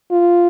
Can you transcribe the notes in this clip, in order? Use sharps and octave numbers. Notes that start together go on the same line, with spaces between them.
F4